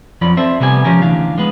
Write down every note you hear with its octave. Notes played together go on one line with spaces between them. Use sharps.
F2 F3 F#3 D5 B5
C4 A4 C5 E5
C3 G3 B3 G#5
C#2 F3 C#4 G4 A#4
D2 E3 D4 F5
G#3 B3 B4